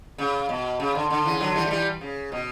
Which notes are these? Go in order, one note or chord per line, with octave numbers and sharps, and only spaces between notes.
C#3
B2
C#3
D3
D3
C#3 E3
D3 F#3
E3 G3
A3
E3 G3
C#3
B2